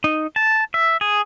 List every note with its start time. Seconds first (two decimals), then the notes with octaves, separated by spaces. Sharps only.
0.04 D#4
0.36 A5
0.74 E5
1.01 G#4